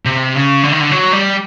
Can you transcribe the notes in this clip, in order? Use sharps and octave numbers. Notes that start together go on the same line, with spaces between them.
C3
C#3
D3
D#3
D3
F#3
G3